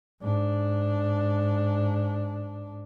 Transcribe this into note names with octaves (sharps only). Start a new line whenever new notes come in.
G#2 D4